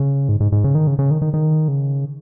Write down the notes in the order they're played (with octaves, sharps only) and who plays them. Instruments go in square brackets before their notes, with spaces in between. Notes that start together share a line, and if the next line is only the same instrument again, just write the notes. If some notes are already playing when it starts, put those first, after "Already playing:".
Already playing: [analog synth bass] C#3
G#2
G#2
G#2
C#3
D#3
C#3
C#3
D#3
D#3
D#3
C#3